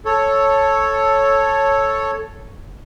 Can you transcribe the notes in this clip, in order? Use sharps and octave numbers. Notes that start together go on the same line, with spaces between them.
A4 C#5